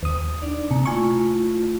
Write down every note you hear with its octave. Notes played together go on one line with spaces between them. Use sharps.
D#2 D#6
D4 D#4 D5
C3 A#3
A3 E4 F4 G#5 C#6